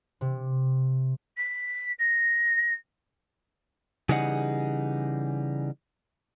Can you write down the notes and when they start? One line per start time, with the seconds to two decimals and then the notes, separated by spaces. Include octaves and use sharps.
0.21 C3
1.37 B6
1.99 A#6
4.09 C#3 E3 G3 D#4 G#4 F#5